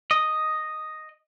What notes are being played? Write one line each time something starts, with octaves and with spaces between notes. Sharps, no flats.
D#5